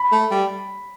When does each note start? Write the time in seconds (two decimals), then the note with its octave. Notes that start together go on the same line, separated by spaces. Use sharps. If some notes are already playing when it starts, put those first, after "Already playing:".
Already playing: B5
0.12 A3
0.31 G3